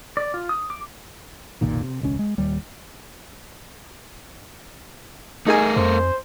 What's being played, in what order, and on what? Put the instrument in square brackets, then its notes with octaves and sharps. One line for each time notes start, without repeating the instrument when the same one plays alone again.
[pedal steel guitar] D5
F4
D#6
D6
[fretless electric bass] F1 B1 A#2 D#3
C3
E1 C#2 C#4
G#3
D#1 D#2 G3
[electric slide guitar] A3 A#4 [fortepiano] D#4 G#4 G#5
[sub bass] F2 [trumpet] C5